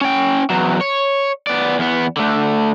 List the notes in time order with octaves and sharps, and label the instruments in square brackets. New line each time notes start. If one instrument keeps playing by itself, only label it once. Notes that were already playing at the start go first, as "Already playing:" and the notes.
[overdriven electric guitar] C#4 G5
E2 F#3
C#5
B3 D5
E2 B3
D3 A3